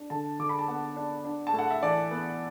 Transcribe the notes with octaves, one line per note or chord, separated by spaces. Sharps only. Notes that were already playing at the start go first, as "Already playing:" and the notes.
Already playing: D4
D3 A5
D3 D6
B5
A5
B3 F#5
D4
D4
A5
A2
F#5
E5
E3 D5
B3